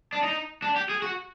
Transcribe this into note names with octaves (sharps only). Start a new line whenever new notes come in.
D4
D#4
D4
G4
G#4
F#4